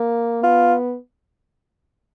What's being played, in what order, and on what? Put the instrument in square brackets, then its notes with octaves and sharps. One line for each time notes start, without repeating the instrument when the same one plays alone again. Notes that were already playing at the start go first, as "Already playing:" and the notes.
Already playing: [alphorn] A#3
[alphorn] B3 [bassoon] F4